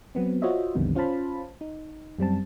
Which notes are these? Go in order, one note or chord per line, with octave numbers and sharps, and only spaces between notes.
F#3 B3 C4
F4 F#4 C5 C#5 D#5 E5
B1 F2 D3 D#3 G3 B3
C#4 F4 C5 F5 A5 B5
D#4
F#2 G3 C4 A5